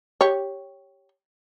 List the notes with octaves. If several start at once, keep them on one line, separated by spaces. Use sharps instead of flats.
G4 C#5